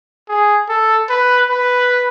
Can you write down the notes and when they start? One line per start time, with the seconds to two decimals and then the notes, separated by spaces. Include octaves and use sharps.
0.29 G#4
0.69 A4
1.09 B4
1.49 B4